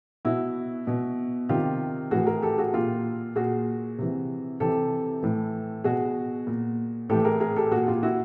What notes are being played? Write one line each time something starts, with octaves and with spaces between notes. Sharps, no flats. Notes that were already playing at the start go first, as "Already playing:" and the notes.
B2 E4 F#4
B2
C3 D#3 F4 G4
A2 E3 F#4 G#4
G#4 A#4
G4 A4
F#4 G#4
A#2 F4 G4
A#2 F#4 G#4
C3 E3
C3 E3 G4 A4
A2 E3
B2 F#4 G#4
A#2
A2 E3 G4 A4
G#4 A#4
G#4 A#4
G4 A4
A#2 F#4 G#4
F4 G4
E4 F#4